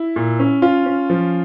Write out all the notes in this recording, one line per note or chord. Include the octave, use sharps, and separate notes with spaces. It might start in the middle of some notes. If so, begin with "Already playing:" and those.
Already playing: E4
A#2
C#4
C#4 F4
C#4
F3